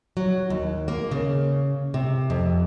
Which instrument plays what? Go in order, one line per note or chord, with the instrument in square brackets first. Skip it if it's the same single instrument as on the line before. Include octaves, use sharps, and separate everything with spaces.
[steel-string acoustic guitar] F#3
D#2
A#3
C#3
C3
F2